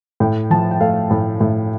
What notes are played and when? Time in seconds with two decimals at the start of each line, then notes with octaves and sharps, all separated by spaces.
0.20 A2 G5
0.50 F3 A5
0.71 G5
0.80 A3 F5
1.11 A2
1.41 A2